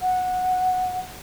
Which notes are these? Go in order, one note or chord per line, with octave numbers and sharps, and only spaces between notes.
F#5